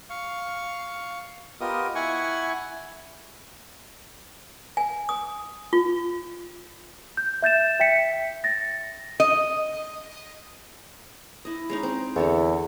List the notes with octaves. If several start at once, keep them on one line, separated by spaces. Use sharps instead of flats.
F5 C#6
B3 F4 G4 A#4 D#5 D#6
E4 F#5 G#5 C#6
G#5
D#6
F4
G6
E5 G6 A6 E7
E5 G5 B6 C#7
A6 A#6
D#5
E4 D#5
G#3 C#4 D#4
C4
E2 D3 A4 C#5